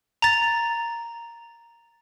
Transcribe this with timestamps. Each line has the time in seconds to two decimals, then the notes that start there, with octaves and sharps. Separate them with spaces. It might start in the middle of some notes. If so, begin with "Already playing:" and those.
0.22 A#5 A6